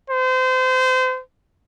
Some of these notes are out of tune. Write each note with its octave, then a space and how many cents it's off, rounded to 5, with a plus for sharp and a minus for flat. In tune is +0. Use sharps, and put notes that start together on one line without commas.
C5 -30